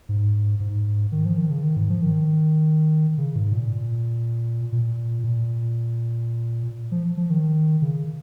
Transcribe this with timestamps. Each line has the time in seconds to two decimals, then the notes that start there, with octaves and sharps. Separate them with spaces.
0.09 G#2
0.60 G#2
1.12 D#3
1.25 F3
1.38 D#3
1.50 C#3
1.63 D#3
1.77 G#2
1.90 F3
2.02 D#3
3.18 C#3
3.36 G#2
3.53 A#2
4.72 A#2
5.24 A#2
6.92 F3
7.17 F3
7.30 D#3
7.82 C#3